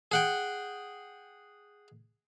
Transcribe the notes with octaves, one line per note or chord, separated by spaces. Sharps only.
G#4 F#5 G5